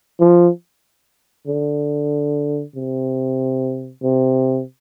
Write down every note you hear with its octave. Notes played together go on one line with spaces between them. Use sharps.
F3
D3
C3
C3